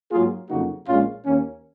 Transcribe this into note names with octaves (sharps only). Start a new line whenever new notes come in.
G#2 F#3 A#3 F4 G#4
F2 C#3 F#3 A#3 D#4 F#4
A#1 A#2 G#3 C#4 F4
D#2 D#3 A#3 C#4